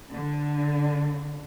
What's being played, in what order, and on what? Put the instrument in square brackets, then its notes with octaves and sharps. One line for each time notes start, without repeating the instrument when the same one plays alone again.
[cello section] D3